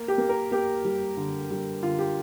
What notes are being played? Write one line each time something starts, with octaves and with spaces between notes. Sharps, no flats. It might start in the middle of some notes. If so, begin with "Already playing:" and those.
Already playing: A#3
G4
A#3
A#4
A#3 G4
G3
D3
G3
D3 F4
G4